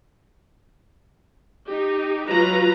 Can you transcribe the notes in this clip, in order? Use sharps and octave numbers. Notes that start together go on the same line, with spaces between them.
D#4 G4
F#3 F4 B4 A#5